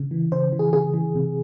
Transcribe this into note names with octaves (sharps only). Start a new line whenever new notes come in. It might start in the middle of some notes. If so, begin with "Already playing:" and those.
Already playing: C#3
E3
C#3 C5
E3
G#4
C#3 G#4
E3
C3